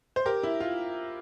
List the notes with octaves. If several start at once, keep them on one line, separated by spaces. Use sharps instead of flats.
C5
G4 A#4
E4
F4